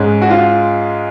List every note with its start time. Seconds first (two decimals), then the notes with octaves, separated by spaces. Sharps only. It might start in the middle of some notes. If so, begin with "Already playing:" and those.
Already playing: G#2 G#3 C#4
0.22 F#4
0.30 F4